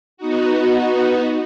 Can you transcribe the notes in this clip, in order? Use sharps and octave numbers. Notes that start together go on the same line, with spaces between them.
B3 D#4 F#4